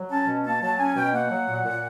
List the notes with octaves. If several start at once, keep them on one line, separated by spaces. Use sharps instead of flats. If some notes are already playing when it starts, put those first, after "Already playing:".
Already playing: F#3
C#4 A5
B2
A#3 A5
F#3 A5
C#4 G#5
B2 G5
A#3 F#5
F#3
A#2
A#2